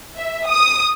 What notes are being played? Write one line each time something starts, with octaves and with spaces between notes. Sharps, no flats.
E5
D#6